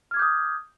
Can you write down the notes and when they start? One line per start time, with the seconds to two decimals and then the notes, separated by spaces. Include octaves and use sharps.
0.11 F6
0.14 G#6
0.17 D6
0.19 G6
0.22 D#6